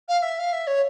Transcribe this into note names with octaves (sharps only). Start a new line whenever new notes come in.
F5
F5
E5
F5
E5
C#5